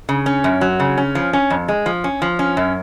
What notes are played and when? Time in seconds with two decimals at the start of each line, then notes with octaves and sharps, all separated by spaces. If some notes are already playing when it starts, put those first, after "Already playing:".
0.09 C#3
0.26 C#4
0.44 F#2
0.61 F#3
0.80 C#3
0.97 C#4
1.15 F3
1.33 C#4
1.50 F2
1.68 G#3
1.86 F3
2.04 C#4
2.22 F3
2.39 C#4
2.57 F#2